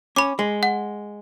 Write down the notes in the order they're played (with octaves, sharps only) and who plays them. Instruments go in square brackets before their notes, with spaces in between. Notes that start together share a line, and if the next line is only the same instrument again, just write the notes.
[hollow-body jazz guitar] C#4 [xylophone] B5 D6
[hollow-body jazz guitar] G#3
[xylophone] F#5